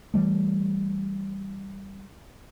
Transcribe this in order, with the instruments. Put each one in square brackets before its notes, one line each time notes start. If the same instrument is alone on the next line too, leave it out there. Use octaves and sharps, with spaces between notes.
[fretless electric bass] E3 G3 A3